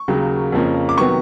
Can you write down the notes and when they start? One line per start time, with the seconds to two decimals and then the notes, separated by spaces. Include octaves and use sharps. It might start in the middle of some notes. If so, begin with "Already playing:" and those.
Already playing: C#6
0.08 D#2 C#3 F#3 A#3
0.52 F2 C#3 F3 A#3 C#4
0.89 D6
0.97 C3 D#3 F#3 B3 C#6